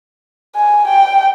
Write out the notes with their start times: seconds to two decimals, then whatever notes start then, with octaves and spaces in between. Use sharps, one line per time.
0.55 G#5
0.87 G5